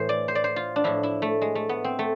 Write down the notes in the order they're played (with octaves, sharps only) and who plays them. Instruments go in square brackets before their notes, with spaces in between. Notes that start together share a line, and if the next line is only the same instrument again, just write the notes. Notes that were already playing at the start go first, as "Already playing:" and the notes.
Already playing: [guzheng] A2 E3 C5
D5
C5
D5
C5
F4
D4
A2 F3 E4
E4
A3
G#3
A3
B3
C4
A3